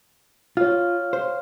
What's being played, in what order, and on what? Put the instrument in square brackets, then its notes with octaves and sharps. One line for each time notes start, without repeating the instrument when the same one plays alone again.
[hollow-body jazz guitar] F4 [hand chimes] C#5 F5 F6
[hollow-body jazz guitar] C5